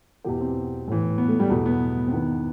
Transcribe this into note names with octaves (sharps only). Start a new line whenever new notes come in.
E2 B2 G4
C4
A2 E3
B3
A3
G3
E2 B2 A3
B3
C4
E2 D#3 B3